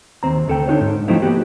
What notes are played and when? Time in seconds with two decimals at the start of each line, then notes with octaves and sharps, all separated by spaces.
0.23 D#2 C4 A#5
0.48 D2 A4 G5
0.67 D4 D#4 F#4 C#5
0.80 G#2
1.08 F3 F#3 A3 C4 D#4 E4
1.22 A#3 B3 F#4 G4